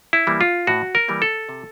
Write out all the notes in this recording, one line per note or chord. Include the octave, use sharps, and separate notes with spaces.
E4
E3 G3 A#3
F4
A2 F#4
A#4
E3 G3 A#3
A4
C3